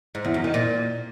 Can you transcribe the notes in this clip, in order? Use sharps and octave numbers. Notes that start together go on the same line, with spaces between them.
G#2
E2
F#2
D#3
A#2